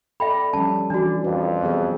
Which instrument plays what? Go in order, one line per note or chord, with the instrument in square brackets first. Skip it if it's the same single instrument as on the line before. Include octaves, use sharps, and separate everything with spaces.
[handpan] A4 D5 [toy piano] E5 G5 B5
[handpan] F3 G3 C#4 [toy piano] A5
[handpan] E3 D5 [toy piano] D4 F#4
[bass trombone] F2 [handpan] B4
[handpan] F#3 B3 G#4